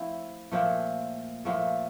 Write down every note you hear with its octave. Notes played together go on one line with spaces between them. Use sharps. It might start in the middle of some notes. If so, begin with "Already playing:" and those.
Already playing: F3 A3 C4 E4
A#2 F3 A3
A#2 F3 A3